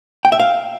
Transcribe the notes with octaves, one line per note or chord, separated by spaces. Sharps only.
G5
E5
F5